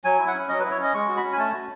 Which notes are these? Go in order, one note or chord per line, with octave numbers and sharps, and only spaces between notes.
F#3 G#5
E4
F#5
C#4
F#3 D#5
E4 B4
C#5
C#4 D#5
G#3 C#6
F#4
B5
C#4
G#5
A3 A5
F#4